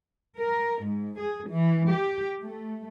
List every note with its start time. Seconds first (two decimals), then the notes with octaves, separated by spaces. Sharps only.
0.38 A#4
0.82 G#2
1.18 G#4
1.48 E3
1.90 G4
2.43 A3